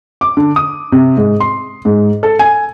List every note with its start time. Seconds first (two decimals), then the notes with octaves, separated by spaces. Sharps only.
0.21 D6
0.37 D3
0.56 D#6
0.92 C3
1.17 G#2
1.40 C6
1.85 G#2
2.23 A4
2.39 G#5